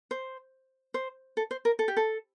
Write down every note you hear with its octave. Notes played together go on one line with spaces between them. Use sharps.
C5
C5
A4
C5
A#4
A4
G4
A4